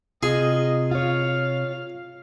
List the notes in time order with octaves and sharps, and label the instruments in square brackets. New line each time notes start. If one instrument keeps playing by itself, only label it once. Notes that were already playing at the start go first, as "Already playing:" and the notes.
[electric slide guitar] C3 [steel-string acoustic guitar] F4 [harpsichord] G#4 [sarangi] D#5
[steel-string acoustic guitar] F4 C#5 [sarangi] F5